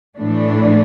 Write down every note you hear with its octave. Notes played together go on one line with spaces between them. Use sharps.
A2 E3 A3 D4